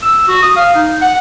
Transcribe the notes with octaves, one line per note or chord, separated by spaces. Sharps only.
E6
F#4
D#6
F5
D#4
F#5